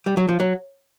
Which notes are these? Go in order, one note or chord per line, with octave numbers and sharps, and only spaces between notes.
G3
F#3
F3
F#3